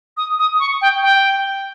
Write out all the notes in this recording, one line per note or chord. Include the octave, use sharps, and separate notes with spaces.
D#6
D#6
C#6
G5
G5